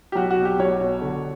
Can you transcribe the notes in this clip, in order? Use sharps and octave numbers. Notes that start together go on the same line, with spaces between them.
G4
B1 F#4
F#4
B2
G4
B1 C#5
B2
D3